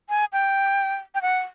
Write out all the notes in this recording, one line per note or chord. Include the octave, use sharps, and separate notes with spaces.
G#5
G5
G5
F#5